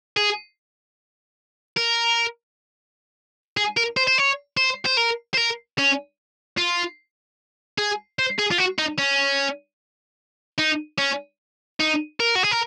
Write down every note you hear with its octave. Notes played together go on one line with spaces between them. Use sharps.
G#4
A#4
G#4
A#4
C5
C5
C#5
C5
C5
A#4
C5
A#4
C#4
F4
G#4
C5
G#4
F4
F#4
D#4
C#4
D#4
C#4
D#4
A#4
F#4
G#4
A#4